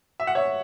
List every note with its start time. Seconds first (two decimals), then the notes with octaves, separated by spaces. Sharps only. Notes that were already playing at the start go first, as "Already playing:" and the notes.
0.20 E5
0.27 F#5
0.35 C#5 E5